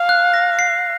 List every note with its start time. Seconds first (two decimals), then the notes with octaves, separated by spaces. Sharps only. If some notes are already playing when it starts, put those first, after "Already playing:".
Already playing: F5
0.09 F#6
0.34 A#6
0.59 C7